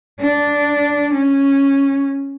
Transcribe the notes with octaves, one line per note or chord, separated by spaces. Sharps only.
D4
C#4